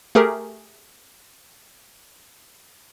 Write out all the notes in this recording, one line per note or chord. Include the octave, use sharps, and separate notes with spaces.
A3 G4 G#4 A#4